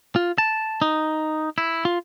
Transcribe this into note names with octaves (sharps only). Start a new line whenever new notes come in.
F4
A5
D#4
E4
F4